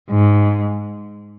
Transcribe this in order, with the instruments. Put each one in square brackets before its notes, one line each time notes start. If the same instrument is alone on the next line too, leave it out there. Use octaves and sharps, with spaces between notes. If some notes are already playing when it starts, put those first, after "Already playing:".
[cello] G#2